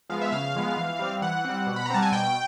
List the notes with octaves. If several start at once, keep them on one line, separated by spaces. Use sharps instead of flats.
F3 G#3 B3 F5
E5
C#3 F5
F3 G#3 B3
E3
G3 C4
E3 F#5
G3 C4
B2
B5
A#5
G3 C4 A5
G#5
B2 G5